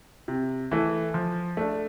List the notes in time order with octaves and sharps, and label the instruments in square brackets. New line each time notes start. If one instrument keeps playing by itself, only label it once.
[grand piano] C3
E3 A3
F3
A3 D4